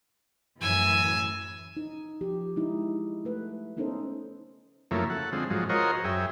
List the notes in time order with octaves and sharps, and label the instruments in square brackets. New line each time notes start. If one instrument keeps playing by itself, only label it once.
[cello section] F#2 A2 E3 [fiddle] G#5 E6
[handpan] D#4
F3 G4
G#3 D#4 E4
A3 B4
B3 C#4 D#4 A4 A#4 C5
[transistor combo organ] F#2 C#3 F3 A3 A#3 E4
A4 F#5
D3 F3 G#3 C4
G#2 F3 F#3
F4 F#4 A#4 C5 C#5 D#5
F#2 G#4 E5 G5